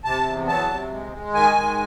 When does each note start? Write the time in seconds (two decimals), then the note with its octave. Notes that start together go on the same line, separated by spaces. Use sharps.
0.05 C3 A5
0.26 E2
0.48 F#3 A5
0.69 C3
0.91 G#3
1.12 G#3
1.34 D#3 G#5
1.55 G#3